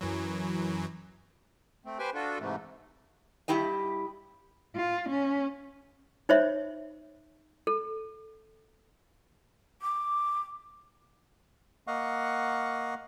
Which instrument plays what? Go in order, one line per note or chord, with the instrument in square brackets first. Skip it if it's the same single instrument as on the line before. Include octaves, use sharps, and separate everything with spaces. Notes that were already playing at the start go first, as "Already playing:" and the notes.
[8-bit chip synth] F#2 E3 F#3
[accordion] A3 C4
G4 B4 C5 G5 G#5
D4 F4 F#4 A4
G#2 C3 E3 A3
[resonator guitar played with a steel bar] G2 E4 G4 D#5
[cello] F4
C#4
[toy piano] D#4 C5 C#5 E5
A4
[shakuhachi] D6
[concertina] A#3 D#5 F5 F#5 C#6